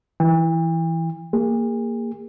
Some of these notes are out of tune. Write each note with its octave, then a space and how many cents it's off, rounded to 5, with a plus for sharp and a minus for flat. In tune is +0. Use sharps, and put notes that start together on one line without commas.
E3 +0 G5 +45
A#3 -10 G#4 -40